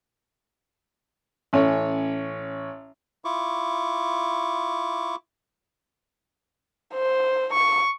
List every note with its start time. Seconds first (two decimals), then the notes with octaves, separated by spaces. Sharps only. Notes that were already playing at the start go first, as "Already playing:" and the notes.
1.53 A1 C#4 C#5
3.25 E4 F4 C#6 D6
6.95 C5
7.54 C#6